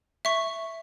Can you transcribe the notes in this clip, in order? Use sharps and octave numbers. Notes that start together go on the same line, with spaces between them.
E5 C#6